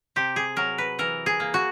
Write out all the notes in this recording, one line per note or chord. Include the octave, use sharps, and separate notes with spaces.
C3 G4
G#4
F#3 A#4
B4
E3 A#4
G#4
A#3
F#4